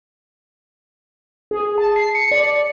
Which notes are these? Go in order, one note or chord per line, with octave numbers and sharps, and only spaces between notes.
G#4
A5
C7
C#7
D5